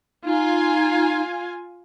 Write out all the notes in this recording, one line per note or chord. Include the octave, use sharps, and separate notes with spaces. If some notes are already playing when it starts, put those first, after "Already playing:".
D#4 F4 G#5